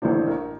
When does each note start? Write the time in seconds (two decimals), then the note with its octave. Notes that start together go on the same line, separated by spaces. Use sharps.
0.02 A1 A2 A3 D4 C5
0.27 A#4